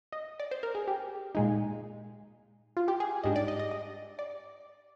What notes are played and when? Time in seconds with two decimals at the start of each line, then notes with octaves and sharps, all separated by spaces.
0.12 D#5
0.40 D5
0.51 C5
0.63 A#4
0.75 G#4
0.87 G4
1.35 A#2 G#3 D#4
2.77 F4
2.88 G4
3.00 G#4
3.24 G#2 G3 D4 D#5
3.36 D5
3.48 D#5
3.60 D#5
3.71 D#5
4.19 D5